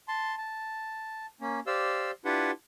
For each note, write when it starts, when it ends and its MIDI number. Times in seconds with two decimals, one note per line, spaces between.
0.08 0.35 81
0.08 0.35 84
0.38 1.26 81
1.40 1.60 58
1.40 1.60 61
1.67 2.11 67
1.67 2.11 72
1.67 2.11 74
1.67 2.11 77
1.67 2.11 88
2.25 2.51 62
2.25 2.51 64
2.25 2.51 65
2.25 2.51 67
2.25 2.51 71
2.25 2.51 78